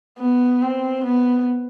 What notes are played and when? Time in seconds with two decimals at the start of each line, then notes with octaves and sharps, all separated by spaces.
0.19 B3
0.62 C4
1.04 B3